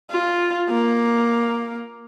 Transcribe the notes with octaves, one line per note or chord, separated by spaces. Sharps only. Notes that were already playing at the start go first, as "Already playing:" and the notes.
F4
A#3